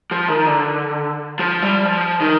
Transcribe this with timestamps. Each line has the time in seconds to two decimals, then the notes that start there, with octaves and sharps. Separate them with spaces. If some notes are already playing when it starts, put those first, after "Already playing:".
0.11 F3
0.28 D#3
0.46 D3
1.39 F3
1.62 G3
1.85 F3
2.20 D#3